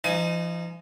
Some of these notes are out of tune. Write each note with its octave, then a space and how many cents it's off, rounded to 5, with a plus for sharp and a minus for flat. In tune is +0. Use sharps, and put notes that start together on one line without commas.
F3 -45 D#4 -20 G#5 +15